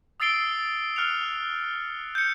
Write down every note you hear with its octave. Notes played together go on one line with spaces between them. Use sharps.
D#6 E6 A6 C7 D7 G7
F6 F#6 C#7 F7
G6 C#7